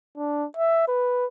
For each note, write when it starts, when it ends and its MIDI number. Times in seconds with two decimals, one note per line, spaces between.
0.17 0.46 62
0.57 0.86 76
0.88 1.26 71